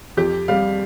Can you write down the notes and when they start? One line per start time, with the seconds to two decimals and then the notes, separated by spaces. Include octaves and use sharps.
0.17 F2 G4
0.48 G3 F5